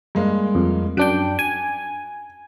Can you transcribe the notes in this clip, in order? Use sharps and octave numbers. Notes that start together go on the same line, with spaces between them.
G2 G#3 A#3
F2
F#2 D4 G5 F#6 D7
G#5